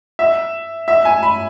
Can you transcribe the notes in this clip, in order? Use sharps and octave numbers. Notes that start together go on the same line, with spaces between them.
E5
E5
G#5
B5